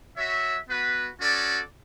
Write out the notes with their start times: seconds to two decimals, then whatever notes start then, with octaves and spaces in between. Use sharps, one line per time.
0.17 F#4 C#5 E5
0.68 B3 F#4 B4
1.20 C#4 F#4 A4 D5